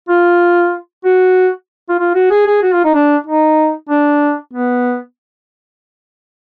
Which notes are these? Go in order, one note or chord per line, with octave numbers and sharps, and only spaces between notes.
F4
F#4
F4
F4
F#4
G#4
G#4
F#4
F4
D#4
D4
D#4
D4
B3